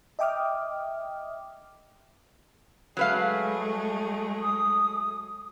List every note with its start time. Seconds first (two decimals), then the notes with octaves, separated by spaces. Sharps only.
0.19 D#5 E5 G5 D6 D#6 F6
2.97 F#3 G#3 A3 G#4 B4 F5
4.43 D#6